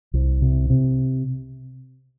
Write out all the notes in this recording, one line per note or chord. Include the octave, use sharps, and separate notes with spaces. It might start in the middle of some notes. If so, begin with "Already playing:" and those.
C2
C3
C3